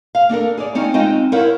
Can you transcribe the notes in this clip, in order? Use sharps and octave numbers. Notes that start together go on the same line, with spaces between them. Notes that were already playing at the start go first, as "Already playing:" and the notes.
F5
A#3 D4 A4 A#4
G#4 C#5 D5
C4 C#4 D#4 F4
G#3 C4 D#4 F4 D#5 G5
E4 A#4 C5 C#5 F5 F#5